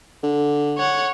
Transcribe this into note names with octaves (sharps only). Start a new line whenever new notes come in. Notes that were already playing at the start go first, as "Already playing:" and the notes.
D3
C#5 F#5